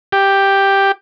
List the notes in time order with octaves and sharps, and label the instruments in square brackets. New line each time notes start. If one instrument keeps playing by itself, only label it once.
[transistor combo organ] G4